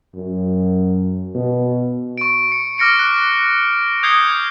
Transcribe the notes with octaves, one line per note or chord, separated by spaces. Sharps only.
F#2
B2
C#6 D7
C#7
D6 F6 A#6 C#7 D7
F#6
D#6 G6 G#6 C7 C#7 G7